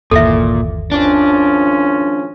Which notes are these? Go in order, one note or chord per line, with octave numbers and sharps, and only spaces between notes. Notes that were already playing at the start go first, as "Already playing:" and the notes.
G1 D#2 A#2 E3 A4 E5
G#1 F3 C#4 D4